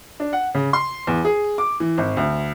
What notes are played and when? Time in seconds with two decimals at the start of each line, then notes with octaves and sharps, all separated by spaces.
0.20 D4
0.33 F#5
0.54 C#3
0.73 C6
1.07 E2
1.25 G#4
1.58 D6
1.80 E3
1.98 G#1
2.17 D2